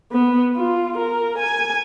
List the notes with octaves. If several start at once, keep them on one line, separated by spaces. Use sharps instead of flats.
B3
F4
A#4
G#5